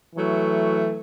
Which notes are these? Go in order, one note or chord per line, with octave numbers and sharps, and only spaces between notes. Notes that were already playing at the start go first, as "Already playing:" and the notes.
E3 F#3 A3